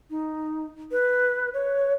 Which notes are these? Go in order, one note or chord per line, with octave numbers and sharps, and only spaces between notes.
D#4
B4
C#5